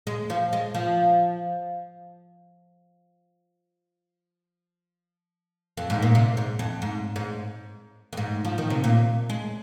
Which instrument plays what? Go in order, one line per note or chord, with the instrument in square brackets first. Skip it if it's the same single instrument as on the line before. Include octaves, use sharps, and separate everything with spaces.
[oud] G#3
F3
G#3
F3
F2
G#2
A#2
C3
G#2
F2
G#2
G#2
F2
G#2
F3
D#3
C3
A#2
G#3